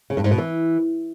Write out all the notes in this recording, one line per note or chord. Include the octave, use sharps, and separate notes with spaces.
C#3
G2
G#2
B2
E3